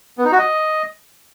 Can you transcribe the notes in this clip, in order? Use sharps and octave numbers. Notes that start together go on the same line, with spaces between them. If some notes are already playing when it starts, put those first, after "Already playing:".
B3
D#4
F#4
D#5